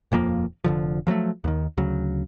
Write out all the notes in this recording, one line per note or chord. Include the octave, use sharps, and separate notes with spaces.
D#1 F2 F3 A#3
F1 D3 F3
F3 F#3 G#3 A3
D#2 D#3
D2 C#3 F#3